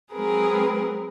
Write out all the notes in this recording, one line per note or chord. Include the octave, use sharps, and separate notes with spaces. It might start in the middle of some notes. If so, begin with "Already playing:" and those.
F#3 G#3 C4 G#4 A#4 B4